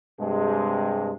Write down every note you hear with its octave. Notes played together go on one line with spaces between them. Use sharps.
G2 C3 G#3